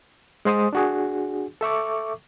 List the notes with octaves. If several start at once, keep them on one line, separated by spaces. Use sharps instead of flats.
G#3 C5 C6 D#6
D4 F#4 G#4
A4 E5 C#6 D6